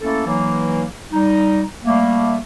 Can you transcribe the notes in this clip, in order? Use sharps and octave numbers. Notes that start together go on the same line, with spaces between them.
A3 A#3 C#4 E4 A4
E3 F#3 A#3 D#4
G3 D#4
G3 A3 A#3